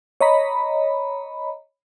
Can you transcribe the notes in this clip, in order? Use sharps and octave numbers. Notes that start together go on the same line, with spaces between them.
C#5 D#5 A#5 B5